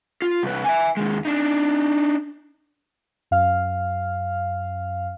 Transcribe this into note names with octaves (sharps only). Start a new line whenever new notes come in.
F4
C2 B4
E5 G#5
D#2 G#3
D4 D#4
F#2 F5 F6